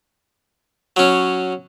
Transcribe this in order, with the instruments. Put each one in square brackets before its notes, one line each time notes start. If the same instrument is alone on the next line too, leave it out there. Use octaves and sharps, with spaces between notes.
[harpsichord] F#3 C#4